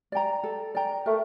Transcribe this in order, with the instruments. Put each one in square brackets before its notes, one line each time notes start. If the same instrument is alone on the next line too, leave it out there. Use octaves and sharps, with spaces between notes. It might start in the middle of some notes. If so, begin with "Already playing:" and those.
[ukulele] D5 G5 A#5
A4
D5 G5 A#5
[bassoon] A3 [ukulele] A#4